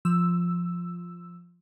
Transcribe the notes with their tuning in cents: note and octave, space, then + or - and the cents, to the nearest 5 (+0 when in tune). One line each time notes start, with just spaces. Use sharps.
F3 +0 E6 +0